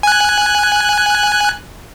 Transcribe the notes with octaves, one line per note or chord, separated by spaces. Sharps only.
G#5 F#6